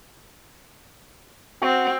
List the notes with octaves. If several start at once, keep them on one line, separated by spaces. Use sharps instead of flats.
C4 F#4